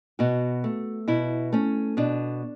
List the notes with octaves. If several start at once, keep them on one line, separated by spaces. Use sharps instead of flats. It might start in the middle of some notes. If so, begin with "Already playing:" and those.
B2 F#4
A3
B2 E4
A3 C#4
B2 D4